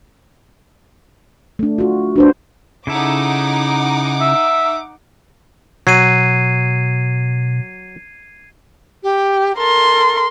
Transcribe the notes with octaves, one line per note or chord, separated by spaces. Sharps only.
A3 D4
F4 F#4
D4 F#4 B4 C5
C#3 D#4 E4 A4 F#5 D6
E5
B2 F#3 G#6 C7 D#7
G4
A4 A#4 C6